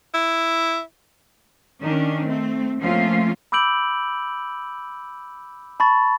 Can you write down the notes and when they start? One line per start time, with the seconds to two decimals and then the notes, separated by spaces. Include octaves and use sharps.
0.14 E4
1.82 D#3 C#4 D4
2.26 A3 C4
2.81 F3 A3 A#3 C4 C#4 F4
3.52 B5 D6 E6 G6 D7 F#7
5.80 A5 B5 C#6 A6